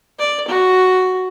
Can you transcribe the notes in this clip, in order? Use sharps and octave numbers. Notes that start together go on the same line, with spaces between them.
D5
F#4